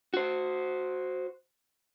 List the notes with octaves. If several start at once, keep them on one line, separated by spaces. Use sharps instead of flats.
F#4 C5